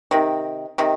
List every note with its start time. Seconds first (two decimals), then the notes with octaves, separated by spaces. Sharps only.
0.11 C3 D#3
0.78 C3 D#3